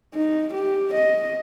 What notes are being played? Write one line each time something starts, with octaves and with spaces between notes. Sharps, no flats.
D#4
G4
D#5